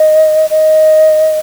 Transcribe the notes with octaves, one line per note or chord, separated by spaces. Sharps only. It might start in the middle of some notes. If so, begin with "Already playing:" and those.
Already playing: D#5
D#5